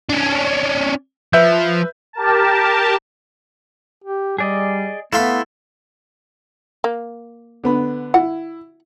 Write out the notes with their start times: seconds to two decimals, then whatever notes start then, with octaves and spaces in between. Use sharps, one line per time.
0.10 C#4 D4
1.33 F3 B4 E5 G6
2.13 G4 A#4 A5
4.04 G4
4.38 G3 G#4 D5 D#5
5.13 A3 B3 E4 F5 B5 C6 E6
6.84 A#3
7.64 D3 B3 B5
8.14 E4 F#5